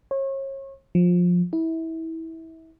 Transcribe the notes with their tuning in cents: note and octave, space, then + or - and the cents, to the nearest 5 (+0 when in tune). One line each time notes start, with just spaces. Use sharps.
C#5 -35
F3 +20
E4 -25